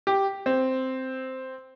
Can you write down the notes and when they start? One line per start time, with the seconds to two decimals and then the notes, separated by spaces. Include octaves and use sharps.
0.07 G4
0.46 C4